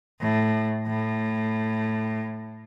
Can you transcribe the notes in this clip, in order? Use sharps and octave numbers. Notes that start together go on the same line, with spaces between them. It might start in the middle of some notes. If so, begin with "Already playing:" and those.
A2
A2